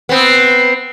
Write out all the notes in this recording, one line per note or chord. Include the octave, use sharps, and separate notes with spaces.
B3 C4